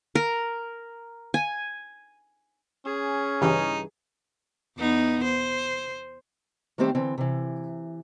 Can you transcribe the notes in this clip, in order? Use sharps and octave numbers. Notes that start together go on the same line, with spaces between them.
A#4
G#5
C#4 G#4
G2 C#3 E3 D#4
E2 B3 D#4
C5
D#3 G3 A3 C4 G4 C5
D3 E3 C4
C3 E3